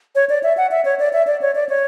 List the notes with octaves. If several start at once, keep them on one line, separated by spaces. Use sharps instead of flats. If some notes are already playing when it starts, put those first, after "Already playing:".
C#5
D5
E5
F#5
E5
C#5
D5
E5
D5
C#5
D5
C#5